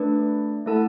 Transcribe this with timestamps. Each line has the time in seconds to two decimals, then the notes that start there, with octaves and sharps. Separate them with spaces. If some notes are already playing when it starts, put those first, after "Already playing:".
Already playing: A3 D4 B4 D5
0.66 A3 E4 A4 F#5 A5